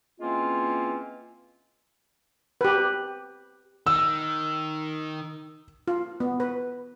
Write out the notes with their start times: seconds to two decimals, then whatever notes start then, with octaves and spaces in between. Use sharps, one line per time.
0.20 E3 G#3 A#3 C4 C#4 F4
2.61 G4 B4
3.87 D#3 E6
5.88 F4
6.20 B3
6.40 B4